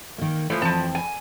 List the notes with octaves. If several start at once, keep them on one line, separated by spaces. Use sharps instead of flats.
D#3 A#3
E3 F3 A3
F2 E3 F3 C4 A5
G#5